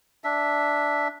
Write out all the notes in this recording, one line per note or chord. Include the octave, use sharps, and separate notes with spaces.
D4 E5